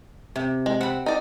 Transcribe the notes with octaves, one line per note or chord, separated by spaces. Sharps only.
C3
G#3
C4 F#5 B5
D#4 D5